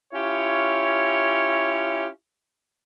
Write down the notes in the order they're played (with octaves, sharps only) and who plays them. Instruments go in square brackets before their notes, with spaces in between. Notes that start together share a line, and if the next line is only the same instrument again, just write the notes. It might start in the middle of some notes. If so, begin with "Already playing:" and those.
[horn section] C#4 E4 F4 G4 C#5